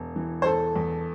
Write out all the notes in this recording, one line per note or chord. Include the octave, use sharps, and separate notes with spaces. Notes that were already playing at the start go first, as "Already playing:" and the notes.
Already playing: E1
E3
C5
E1 A4
E2